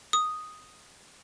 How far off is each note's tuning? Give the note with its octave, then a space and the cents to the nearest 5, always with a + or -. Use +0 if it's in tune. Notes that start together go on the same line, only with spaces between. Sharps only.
D#6 +0